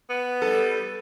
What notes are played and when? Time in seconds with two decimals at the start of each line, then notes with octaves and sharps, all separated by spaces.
0.10 B3
0.42 G3 A4